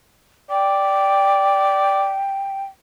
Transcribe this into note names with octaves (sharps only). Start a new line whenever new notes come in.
D5 G5